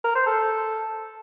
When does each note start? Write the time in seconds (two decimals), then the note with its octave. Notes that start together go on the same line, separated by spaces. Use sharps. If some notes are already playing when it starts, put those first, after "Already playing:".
0.04 A#4
0.15 C5
0.26 A4